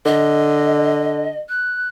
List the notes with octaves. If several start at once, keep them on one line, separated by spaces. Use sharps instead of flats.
D3 D#5
F#6